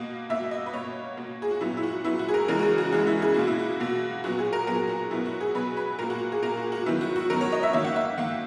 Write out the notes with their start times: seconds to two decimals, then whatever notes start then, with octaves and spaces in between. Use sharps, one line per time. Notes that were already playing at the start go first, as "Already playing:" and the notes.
Already playing: B2 A#3 D#5
0.30 B2 A#3 E5
0.51 D#5
0.66 B4
0.73 B2 A#3 C#5
1.17 B2 A#3
1.42 G#4
1.51 F#4
1.61 A#2 F#3 B3 E4
1.77 E4
1.83 F#4
2.04 A#2 F#3 B3 E4
2.19 F#4
2.29 G#4
2.34 A#4
2.48 C#3 E3 G#3 A#4
2.59 F#4
2.63 G#4
2.78 F#4
2.92 C#3 E3 G#3 F#4
3.07 E4
3.22 G#4
3.34 B2 A#3 F#4
3.47 E4
3.59 F#4
3.80 B2 A#3
4.24 A#2 F#3 B3 F#4
4.39 G#4
4.53 A#4
4.67 A#2 F#3 B3 A#4
4.89 F#4
5.11 B2 F#3 B3 E4
5.26 F#4
5.41 G#4
5.55 B2 F#3 B3 B4
5.77 B4
5.99 A#2 A#3 A#4
6.10 F#4
6.32 G#4
6.42 A#2 A#3 A#4
6.57 F#4
6.72 F#4
6.86 D#3 F#3 B3 E4
7.01 F#4
7.16 F#4
7.30 D#3 F#3 B3 A#4
7.41 C#5
7.52 D#5
7.63 E5
7.73 D#3 A#3 E5
7.84 F#5
7.96 E5
8.18 D#3 A#3 F#5